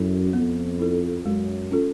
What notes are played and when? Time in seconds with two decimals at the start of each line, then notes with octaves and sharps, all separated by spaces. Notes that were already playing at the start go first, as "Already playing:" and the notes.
Already playing: F#2 E4 A4
0.33 F2 B3
0.79 E4 A4
1.25 F#2 G#3
1.71 C#4 F4 A4